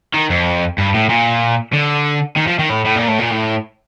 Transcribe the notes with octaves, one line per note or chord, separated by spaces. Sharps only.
D#3
F2
G2
A2
A#2
D3
D#3
F3
D#3
A2
A2
A#2
A2
A#2
A2